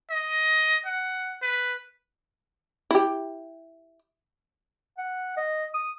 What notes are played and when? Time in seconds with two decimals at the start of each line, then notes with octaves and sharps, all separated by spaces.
0.10 D#5
0.86 F#5
1.42 B4
2.91 E4 G4
4.98 F#5
5.37 D#5
5.74 D#6